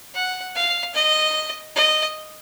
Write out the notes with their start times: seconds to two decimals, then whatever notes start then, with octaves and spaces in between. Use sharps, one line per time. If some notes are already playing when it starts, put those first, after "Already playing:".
0.14 F#5
0.55 F5
0.94 D#5
1.75 D#5